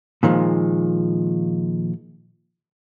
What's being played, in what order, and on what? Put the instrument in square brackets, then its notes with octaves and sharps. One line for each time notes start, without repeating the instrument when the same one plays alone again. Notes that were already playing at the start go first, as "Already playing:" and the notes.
[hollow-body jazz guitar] A#2 D#3 F3 G#3